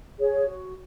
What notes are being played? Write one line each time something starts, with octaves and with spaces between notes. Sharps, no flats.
G#4 C#5
F#4